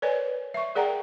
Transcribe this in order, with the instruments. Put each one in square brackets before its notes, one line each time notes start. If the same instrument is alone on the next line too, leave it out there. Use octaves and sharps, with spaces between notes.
[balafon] A#4 B4 C#5 D5 G#5
E5 C#6
G#4 A#4 D5 F#5 G5 A#5